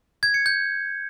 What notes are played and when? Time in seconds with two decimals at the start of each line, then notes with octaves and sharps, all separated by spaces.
0.23 G#6
0.34 C#7
0.46 G6